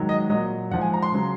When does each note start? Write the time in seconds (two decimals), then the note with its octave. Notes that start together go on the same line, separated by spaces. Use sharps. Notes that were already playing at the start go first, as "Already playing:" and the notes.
Already playing: G#2 D#3 F#3
0.09 D#5
0.30 A#2 F#3 D#5
0.71 G#2 F3 F#5
0.81 G#5
0.93 A#5
1.02 C6
1.12 C#3 F#3